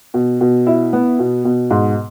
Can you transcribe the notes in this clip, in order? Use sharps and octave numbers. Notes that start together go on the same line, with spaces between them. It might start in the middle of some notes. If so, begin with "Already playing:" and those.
B2
B2
E4
B3
B2
B2
G#2